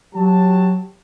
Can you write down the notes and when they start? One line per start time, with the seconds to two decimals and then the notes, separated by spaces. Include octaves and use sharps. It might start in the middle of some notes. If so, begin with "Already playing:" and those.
0.15 F#3 G4 A5